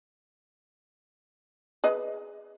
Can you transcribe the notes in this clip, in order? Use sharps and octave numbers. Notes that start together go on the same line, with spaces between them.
G#4 B4 D#5